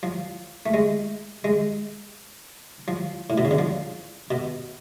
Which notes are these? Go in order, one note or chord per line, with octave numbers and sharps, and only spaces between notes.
F3
A3
G#3
G#3
F3
A2
B2
C#3
D3
F3
B2